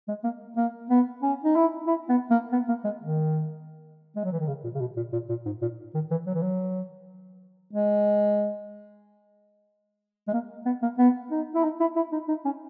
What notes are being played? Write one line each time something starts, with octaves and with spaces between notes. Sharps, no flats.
G#3
A#3
A#3
B3
C#4
D#4
E4
E4
B3
A#3
B3
A#3
G#3
D#3
G#3
F#3
E3
D#3
C#3
A#2
C#3
B2
A#2
A#2
A#2
G#2
A#2
D#3
E3
F#3
E3
F#3
G#3
G#3
A#3
B3
A#3
B3
D#4
E4
D#4
E4
E4
D#4
D#4
C#4